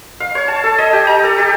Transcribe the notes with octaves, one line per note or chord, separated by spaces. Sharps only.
F5
C#5
A5
A4
D#5
G4
A#5
A4
G4